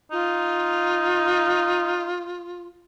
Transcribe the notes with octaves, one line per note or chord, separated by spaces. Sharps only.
D#4 F4